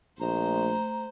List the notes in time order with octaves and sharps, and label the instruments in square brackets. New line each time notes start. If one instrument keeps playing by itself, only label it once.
[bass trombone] A#1 [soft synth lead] A3 [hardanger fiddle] C5 [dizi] A#5